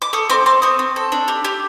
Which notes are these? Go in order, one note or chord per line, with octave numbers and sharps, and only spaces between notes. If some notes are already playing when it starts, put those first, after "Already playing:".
D6
A4 C#6 D#6
C4 C6 D6
C4 C6 D6
C4 C#6 D#6
C4
A4
D4
G4
G4